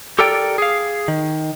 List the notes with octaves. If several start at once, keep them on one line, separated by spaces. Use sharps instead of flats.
G4 A4 A#4 D5 G5
G#4 F5
D#3